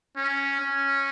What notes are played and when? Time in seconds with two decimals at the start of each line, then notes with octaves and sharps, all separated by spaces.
0.16 C#4
0.60 C#4